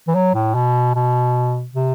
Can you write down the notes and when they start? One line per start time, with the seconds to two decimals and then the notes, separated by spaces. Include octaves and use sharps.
0.08 E3
0.15 F#3
0.35 A2
0.55 B2
0.95 B2
1.75 C3